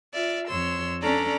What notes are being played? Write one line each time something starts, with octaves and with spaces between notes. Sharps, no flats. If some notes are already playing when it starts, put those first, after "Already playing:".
F4 D5 E5
F2 C#5 C6 E6
C#4 D4 A4 D5 A#5